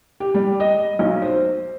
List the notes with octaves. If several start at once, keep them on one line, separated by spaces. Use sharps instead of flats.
G4
G3
D#5
B1
C5